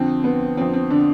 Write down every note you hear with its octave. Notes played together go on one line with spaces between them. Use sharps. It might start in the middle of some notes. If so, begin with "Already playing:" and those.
Already playing: F2 D3 F3 C4
B3
F2 D3 F3 C4
C4
D3 D4